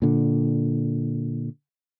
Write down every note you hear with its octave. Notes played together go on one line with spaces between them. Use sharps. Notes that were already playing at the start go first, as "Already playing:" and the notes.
A#2 D3